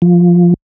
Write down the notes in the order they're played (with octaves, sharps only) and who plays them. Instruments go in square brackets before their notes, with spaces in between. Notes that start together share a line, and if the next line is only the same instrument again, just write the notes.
[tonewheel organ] F3